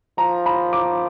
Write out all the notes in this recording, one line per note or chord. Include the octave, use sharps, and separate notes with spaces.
F3 A#5
B5
D6